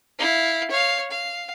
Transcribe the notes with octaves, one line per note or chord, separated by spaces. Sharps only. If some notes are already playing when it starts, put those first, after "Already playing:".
E4 F5
C#5 F5
F5